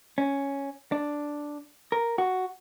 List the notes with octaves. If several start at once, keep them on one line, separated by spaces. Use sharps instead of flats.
C#4
D4
A#4
F#4